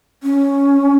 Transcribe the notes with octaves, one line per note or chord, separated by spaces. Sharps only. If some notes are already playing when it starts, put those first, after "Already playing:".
C#4